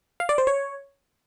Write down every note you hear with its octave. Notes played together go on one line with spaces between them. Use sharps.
F5
D5
C5
C#5